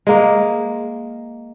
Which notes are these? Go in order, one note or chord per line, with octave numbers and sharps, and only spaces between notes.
G#3 A#3